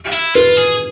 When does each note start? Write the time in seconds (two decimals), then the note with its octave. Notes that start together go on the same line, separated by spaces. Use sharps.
0.14 E4
0.35 F4 B4
0.57 G#4